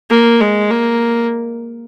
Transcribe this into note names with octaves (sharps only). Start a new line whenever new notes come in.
A#3
G#3
A#3